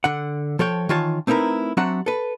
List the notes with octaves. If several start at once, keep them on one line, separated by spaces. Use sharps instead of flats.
D3 F#5
F3 A4 C#5 G5
D#3 E3 F4 C#5 A5
A3 C4 D#4 E4 A#4 B4
F#3 C4 D4 F#4 E5 F#5
A4 B4